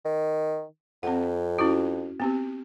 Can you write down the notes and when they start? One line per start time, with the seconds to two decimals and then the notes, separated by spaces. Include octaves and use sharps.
0.05 D#3
1.03 F2 C4 F#5
1.59 C#4 E4 F#4
2.20 B3 C4 G4